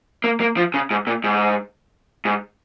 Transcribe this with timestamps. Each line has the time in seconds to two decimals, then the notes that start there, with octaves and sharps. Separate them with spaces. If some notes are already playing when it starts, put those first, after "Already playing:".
0.24 A#3
0.40 A#3
0.57 F3
0.74 C#3
0.91 G#2
1.07 A#2
1.24 G#2
2.25 G#2